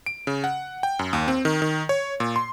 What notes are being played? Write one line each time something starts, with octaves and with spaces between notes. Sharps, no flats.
D7
C#3
F#5
G5
F#2
D#2
C4
D#3
D#3
C#5
A#2
C6